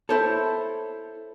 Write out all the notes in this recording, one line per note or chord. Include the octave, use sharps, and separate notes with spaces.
E4 A4 C5 C#5